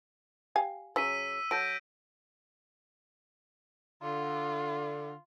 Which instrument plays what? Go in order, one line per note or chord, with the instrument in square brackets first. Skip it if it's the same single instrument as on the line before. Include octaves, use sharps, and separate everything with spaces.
[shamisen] G4 F5 G#5
[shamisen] C#3 F#3 [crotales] E6 B6 D#7
[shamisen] F#3 A4 [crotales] G6 A#6 D7
[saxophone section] D3 [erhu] F4